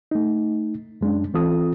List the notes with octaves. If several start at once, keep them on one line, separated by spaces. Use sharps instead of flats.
A3 D#4
F#2 G#3 C#4 D4
E3 C4 F4 A4 D#6